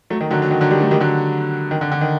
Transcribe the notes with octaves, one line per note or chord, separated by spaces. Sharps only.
F#3 A3
D#3
D3 F#3
F#3
D#3
D3 F#3
D#3 G3
F#3 A3
D#3 G3
D3 F#3
D#3
D3
D3
D#3